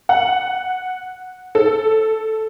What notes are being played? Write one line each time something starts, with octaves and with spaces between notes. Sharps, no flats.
F#5
A4